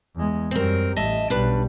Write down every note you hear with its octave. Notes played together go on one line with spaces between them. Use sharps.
E2 G#3
F#2 G3 C4 A#4
A1 D#5 E5 A5
B1 G3 D4 B4